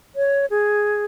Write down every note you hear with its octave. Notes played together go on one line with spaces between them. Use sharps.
C#5
G#4